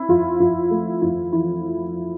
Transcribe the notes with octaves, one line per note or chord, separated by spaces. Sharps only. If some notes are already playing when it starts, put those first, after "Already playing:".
Already playing: C4 E4
F2 F4
F2 F4
A3
F2 E4
E3 E4